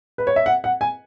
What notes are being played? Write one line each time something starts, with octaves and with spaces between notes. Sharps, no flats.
B4
C#5
E5
F#5
F#5
G#5